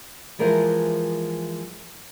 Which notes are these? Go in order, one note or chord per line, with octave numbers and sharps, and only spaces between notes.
E3 F3 G#3 A#4 C5 E5